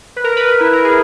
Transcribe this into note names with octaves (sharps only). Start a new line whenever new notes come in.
B4
A#4
B4
B4
E4
A#4
G#4